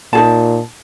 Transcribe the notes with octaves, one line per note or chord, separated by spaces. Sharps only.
A#2 D#4 G#4 A5